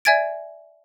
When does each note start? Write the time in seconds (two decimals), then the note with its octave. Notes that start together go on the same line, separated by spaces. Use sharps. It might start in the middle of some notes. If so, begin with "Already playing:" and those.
0.05 D5 E5 G#5 G#6 A6 D7